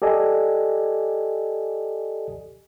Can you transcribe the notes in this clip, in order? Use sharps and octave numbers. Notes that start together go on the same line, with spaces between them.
G4 A4 D5 D#5 G#5